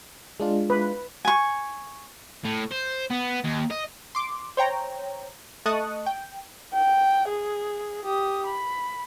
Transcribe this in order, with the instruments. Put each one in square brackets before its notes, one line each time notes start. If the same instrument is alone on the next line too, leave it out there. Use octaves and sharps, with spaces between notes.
[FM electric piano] G#3 D4 F4
[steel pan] B4
[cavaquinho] G#5 C#6
[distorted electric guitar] A2
C5
B3
D#2
D#5
[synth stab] C6 D6
C5 C#5 G5 A#5
A3 D#5 A5 C#6 D#6 F#6
G5
[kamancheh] G5
G#4
G4 D#6
B5